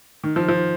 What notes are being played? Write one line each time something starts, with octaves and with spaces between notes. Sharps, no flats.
D#3
F3
F3